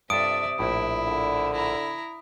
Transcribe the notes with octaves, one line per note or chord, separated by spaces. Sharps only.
G2 C3 F4 A4 D5 E5 D#6 D7
A#1 A2 E4
D3
E4 A#5